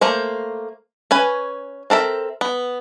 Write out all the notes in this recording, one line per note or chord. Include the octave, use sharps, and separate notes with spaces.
A3 A#3 C5
C#4 B4 G#5
C4 A4 A#4 E5
B3